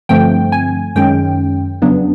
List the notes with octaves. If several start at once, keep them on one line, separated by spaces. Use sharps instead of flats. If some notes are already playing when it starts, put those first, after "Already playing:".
G2 D3 F3 A3 C4 G5
G#5
F#2 D#3 G#3 C#4 G5
F2 C#3 F#3 B3 D4